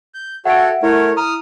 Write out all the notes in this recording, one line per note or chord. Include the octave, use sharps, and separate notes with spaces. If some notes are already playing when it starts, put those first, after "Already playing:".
G6
F#4 A4 C#5 E5 F#5 G5 D7
A3 E4 A#4 C#5
A#5 D#6 F6